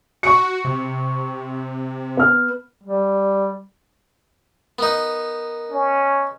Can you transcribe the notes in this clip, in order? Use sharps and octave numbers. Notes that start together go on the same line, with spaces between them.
F#4 C#6 C#7
C3
B3 F6
G3
B3 D#4 A#4
C#4